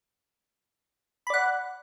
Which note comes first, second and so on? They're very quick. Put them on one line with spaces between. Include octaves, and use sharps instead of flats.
B5 D5 F#5